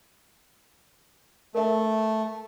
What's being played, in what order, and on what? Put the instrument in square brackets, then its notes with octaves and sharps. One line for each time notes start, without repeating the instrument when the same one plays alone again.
[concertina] A3 [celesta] A#4 E5